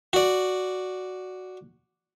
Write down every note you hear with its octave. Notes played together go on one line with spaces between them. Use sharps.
F#4 D5